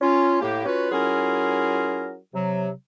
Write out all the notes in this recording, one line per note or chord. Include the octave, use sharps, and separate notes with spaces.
C#4 F4
A2 A#3 G4
C#4 F4 F#4 B4
F#3 C#4 E4 F4 G#4 A#4
C3 F#3